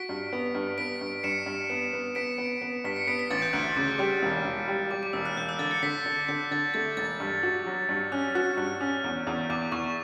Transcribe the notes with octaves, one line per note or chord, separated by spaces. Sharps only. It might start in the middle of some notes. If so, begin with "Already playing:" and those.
Already playing: F#4 B6 D7
G2
B3
G2
B3 B6 D7
G2
G2 C#7 E7
G2
B3
B3
B3 B6 D7
B3
B3
G2 B6
C#7
B3 B6 D7
B6
A1 A6
G6
D2 F#6
C#3 D6
G3
E1
E1
G3
G3 D6
D6
E1 E6
F#6
E1 G6
E6
D3 A6
A6 C#7
D3 B6
D3
D3 G6
D3 A6
A3 A6
E1 A6
G2
F#4
F#3
G2
C#4 F#6
F#4 F#6
G2 F#6
C#4
E2
E2
E2 D6
E2 C#6